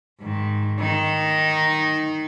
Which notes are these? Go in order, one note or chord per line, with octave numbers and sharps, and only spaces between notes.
G#2 D#3
D#3 D#4